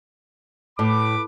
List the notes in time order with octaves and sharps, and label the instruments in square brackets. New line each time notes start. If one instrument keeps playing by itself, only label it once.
[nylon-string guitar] A2 [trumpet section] B4 B5 D6